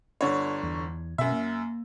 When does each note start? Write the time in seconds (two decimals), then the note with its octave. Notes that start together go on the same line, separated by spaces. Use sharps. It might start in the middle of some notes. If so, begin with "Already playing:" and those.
0.21 G1 D3 C#5
0.63 E2
1.18 F#2 B2 E5
1.32 A#3